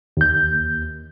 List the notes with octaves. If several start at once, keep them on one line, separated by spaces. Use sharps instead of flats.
D#2 G6